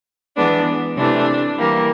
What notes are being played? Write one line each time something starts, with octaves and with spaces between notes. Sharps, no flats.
E3 G#3 B3 D4
C3 E3 A3 D4
E3 G3 A#3